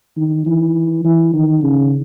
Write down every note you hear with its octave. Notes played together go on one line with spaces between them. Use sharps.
D#3
E3
E3
D#3
C#3